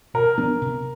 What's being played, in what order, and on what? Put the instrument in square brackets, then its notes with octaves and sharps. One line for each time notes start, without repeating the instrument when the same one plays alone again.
[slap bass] B2 [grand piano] A#4
[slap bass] F#3 B3 D4
C3